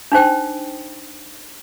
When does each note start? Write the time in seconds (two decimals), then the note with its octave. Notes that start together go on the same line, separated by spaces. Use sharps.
0.12 D4 D#4 C5 G5